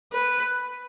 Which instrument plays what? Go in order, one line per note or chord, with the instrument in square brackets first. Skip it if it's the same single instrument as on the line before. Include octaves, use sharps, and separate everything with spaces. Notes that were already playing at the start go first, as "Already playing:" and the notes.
[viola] B4